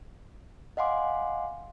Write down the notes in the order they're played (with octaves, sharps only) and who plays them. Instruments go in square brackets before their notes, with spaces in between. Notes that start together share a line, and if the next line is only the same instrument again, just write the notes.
[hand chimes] D#5 F5 F#5 G#5 C6 D6